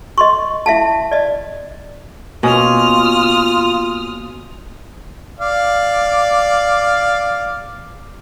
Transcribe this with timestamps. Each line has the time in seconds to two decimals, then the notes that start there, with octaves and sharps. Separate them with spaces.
0.18 D#5 C6 C#6
0.66 E4 E5 F5 A5
1.11 D5 D#5
2.43 B2 A#3 C#4 F4 G#5 D#6 F6
5.40 D5 F5